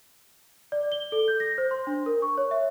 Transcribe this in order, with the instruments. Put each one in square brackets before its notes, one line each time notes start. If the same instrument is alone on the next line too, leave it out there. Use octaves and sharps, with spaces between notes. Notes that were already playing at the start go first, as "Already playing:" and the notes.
[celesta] D5
G7
A4
G6
A#6
C5
C6
D4
A#4
C#6
C#5
E5